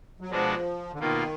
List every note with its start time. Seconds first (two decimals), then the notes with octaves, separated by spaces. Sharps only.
0.21 F#3
0.30 B2 F3 G#3 D4 F#4
0.93 D3
0.99 B2 D#3 A#3 F4